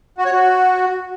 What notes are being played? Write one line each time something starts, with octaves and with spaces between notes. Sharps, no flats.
F#4
C#5
F#4